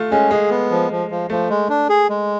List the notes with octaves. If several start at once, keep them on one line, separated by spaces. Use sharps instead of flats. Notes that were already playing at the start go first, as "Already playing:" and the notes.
Already playing: A3 F4
G#3 C#4
G#3 G#4
B3
F3
F3
F3
F3 A3
G#3
D4
G#4
G#3